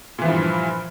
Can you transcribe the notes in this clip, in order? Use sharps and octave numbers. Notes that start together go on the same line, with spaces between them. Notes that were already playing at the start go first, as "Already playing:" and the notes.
G2 A#2 E3 F3